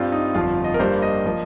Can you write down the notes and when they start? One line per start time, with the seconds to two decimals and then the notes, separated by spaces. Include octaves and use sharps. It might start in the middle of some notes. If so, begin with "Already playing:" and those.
Already playing: G2 G3 C4 F4
0.12 D#4
0.34 G1 F2 F3 F4
0.64 D#5
0.74 A#4
0.79 G2 G3 A#3 C5
1.02 D#5
1.26 F3 A#3